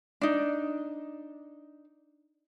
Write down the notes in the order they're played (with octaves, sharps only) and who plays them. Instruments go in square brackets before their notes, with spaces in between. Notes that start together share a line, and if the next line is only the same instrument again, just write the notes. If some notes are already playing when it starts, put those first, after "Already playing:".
[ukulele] D4 D#4